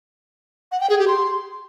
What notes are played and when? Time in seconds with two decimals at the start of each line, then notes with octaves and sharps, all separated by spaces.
0.72 F#5
0.81 G5
0.90 G#4
0.99 G4
1.08 C6